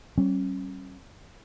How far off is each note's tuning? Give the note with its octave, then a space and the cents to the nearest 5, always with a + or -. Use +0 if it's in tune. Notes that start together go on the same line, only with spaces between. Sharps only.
G3 -40 C#4 -35